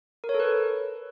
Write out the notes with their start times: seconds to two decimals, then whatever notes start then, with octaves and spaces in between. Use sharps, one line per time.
0.24 A#4
0.29 C#5
0.34 A4
0.40 B4